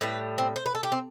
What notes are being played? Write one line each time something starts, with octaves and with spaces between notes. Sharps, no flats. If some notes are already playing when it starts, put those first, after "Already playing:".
A2 G3 B4
C4
C5
B4
A4
G4
C4